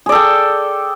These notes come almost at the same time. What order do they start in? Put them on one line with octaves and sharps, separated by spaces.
G#4 D5 A4 G5